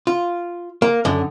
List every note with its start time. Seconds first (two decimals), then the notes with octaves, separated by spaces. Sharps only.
0.07 F4
0.82 A#3
1.05 F#2 D3